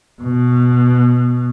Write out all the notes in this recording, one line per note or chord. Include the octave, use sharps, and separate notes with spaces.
B2